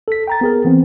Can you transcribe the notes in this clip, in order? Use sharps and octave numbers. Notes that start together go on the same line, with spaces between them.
A4 B6
G5 A#5 A6
B3 G#4 A#4
E3 B3 C4